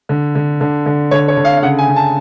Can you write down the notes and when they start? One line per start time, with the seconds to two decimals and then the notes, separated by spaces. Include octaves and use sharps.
0.09 D3
0.35 D3
0.61 D3
0.86 D3
1.11 D3 C#5
1.28 C#5
1.37 D3
1.45 F5
1.57 F5
1.63 C#3 F#5
1.79 G#5
1.88 C#3
1.96 A5